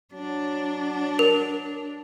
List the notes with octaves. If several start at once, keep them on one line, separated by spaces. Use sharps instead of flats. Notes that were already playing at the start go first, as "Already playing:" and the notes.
F#3 D4
A#4